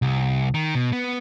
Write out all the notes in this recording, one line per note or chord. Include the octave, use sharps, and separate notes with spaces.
C2
D#3
B2
B3